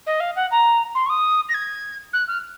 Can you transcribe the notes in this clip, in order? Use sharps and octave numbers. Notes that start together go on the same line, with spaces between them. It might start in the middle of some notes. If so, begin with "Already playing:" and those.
D#5
F5
F#5
A#5
C6
C#6
D#6
A#6
G#6
F#6
F6